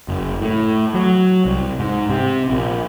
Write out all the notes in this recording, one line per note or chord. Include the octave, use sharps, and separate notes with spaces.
F#1
A2
F#3
C2
G#2
C3
A#1